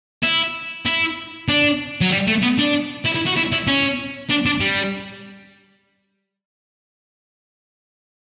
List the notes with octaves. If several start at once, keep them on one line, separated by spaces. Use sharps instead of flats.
E4
E4
D4
F#3
G3
A3
B3
D4
E4
E4
F#4
E4
E4
C#4
D4
D4
G3